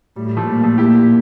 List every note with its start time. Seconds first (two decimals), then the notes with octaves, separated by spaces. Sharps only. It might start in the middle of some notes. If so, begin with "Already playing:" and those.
0.16 A2 G3
0.26 G3
0.37 F3 A3
0.47 A#2 G3
0.63 F3 A3
0.78 A#2 E4 G4